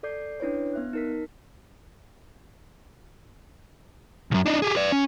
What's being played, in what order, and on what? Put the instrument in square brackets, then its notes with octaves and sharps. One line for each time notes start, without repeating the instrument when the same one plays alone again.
[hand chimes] A4 D5 D6 G6 C7
C#4 D4 E4 B4 C#5
B3 E5 F#6
D#4 A#4 B6
[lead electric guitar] C2 F#2
D4 D#4
G4 G#4
B4 D5
C#4